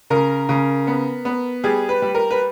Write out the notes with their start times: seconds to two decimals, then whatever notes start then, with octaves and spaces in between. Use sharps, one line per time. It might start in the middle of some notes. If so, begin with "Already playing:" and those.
0.10 C#3 A#4
0.49 C#3
0.87 B3
1.25 B3
1.64 G3 G#4
1.89 B4
2.02 G3
2.15 A#4
2.31 B4